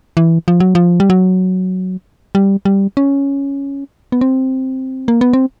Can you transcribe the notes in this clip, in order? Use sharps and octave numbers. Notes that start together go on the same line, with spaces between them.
E3
F3
F#3
F3
G3
F#3
G3
G3
C#4
B3
C4
A#3
B3
C4